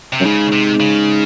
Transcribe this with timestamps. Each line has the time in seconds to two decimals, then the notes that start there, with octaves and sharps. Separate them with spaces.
0.13 C3
0.20 F#2
0.25 G#2 C#3
0.53 C3
0.80 C#3